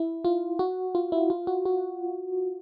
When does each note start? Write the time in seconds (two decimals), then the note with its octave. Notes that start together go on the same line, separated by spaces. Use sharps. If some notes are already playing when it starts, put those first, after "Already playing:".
Already playing: E4
0.25 F4
0.59 F#4
0.95 F4
1.12 E4
1.30 F4
1.47 F#4
1.65 F#4